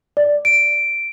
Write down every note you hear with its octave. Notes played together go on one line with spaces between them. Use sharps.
D5
D7